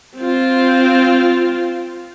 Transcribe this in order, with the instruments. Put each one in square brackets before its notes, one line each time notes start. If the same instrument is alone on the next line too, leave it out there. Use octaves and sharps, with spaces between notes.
[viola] C4 F4